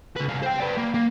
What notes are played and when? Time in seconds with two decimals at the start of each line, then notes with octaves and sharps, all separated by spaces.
0.16 C#2 B4
0.28 C2 F4
0.43 C5 G5
0.60 B4 D5
0.78 A#3
0.94 A#3